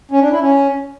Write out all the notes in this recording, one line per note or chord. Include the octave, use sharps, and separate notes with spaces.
C#4
D4
E4
C#4